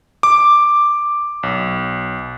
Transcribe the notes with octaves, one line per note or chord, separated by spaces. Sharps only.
D6
B1